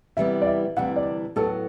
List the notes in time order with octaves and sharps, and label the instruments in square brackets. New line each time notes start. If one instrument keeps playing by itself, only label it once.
[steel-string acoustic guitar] C3 E3 G3 B3 [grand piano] E5
[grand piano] D5
E5
[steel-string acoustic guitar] D2 C3 E3 G3 D4 [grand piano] F#5
[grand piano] D5
[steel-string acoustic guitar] A2 F#3 B3 [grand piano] A4